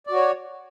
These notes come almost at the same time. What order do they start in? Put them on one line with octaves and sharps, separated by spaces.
D5 F#4 C#5